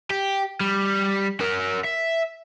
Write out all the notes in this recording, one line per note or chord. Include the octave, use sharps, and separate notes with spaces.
G4
G3
F#4 A#4
E5